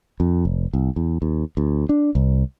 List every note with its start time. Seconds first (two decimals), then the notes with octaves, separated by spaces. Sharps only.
0.20 F2
0.45 F1
0.74 C2
0.96 E2
1.22 D#2
1.57 D2
1.89 D4
2.15 C2